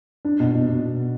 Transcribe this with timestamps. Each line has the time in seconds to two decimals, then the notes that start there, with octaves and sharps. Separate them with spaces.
0.25 D4
0.40 B2
0.54 B2
0.69 B2